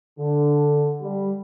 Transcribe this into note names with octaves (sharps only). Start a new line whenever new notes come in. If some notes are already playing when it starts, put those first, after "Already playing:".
D3
G3